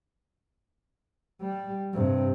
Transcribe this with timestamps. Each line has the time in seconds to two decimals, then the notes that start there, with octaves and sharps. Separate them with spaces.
1.41 G3
1.94 G2 C3